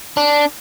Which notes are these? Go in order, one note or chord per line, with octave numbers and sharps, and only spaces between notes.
D4